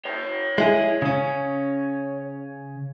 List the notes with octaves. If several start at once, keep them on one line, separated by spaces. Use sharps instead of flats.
C#5 G5
G#3 E4 G#4
C#3 C#4